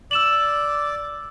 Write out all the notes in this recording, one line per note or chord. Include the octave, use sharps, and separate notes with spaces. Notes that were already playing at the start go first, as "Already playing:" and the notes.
D5 D6 E6 E7 F#7